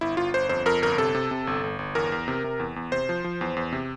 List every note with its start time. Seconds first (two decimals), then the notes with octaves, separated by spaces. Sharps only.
0.01 G1 E4
0.17 G1 F4
0.34 G1 C5
0.49 F2 C5
0.66 F2 A#4
0.82 G1 A#4
0.98 C3 A4
1.15 C3
1.31 C3
1.47 G1
1.63 G1
1.79 G1
1.95 E2 A#4
2.12 E2
2.28 C3
2.44 C3
2.60 E2
2.76 E2
2.92 C3 C5
3.09 F3
3.24 F3
3.41 E2
3.56 E2
3.73 C3